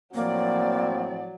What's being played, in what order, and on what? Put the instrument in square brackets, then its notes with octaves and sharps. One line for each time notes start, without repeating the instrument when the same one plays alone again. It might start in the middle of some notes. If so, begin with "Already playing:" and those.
[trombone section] A2 C4 [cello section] F3 D5 [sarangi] F#3 [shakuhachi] A#3